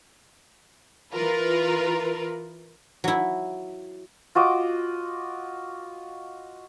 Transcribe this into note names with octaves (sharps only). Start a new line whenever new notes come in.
E3 F4 A#4 B4
F#3 E4
F4 F#4 D#5 D6